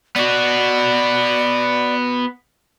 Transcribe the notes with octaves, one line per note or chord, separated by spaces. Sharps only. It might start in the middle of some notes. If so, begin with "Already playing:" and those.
B3 F#4 D5